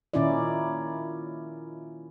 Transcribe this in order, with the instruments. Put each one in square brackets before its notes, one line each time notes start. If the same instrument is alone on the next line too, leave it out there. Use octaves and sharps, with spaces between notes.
[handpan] A#2 D#3 C#4 D#4 E4 D5